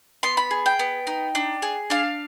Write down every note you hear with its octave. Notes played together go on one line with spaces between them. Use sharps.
B3 C6
B5
G#4
G5
B3
D#4
D4
G#4
D4 F5